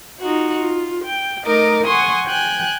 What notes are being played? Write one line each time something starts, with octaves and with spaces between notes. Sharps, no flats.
D#4 F4 F#4
F4
G5
A3 D#4 A#4 D#5 D6
F#5 G#5 C6 C#6 D#6
G5 G#5 F#6 G#6